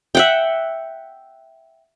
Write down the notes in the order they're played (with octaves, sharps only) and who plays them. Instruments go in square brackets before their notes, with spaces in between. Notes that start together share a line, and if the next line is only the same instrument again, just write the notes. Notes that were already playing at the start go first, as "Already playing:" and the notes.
[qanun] E5 F#5 G5